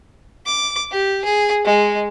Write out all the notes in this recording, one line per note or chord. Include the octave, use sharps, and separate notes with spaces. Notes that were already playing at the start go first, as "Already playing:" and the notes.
D6
G4
G#4
G#3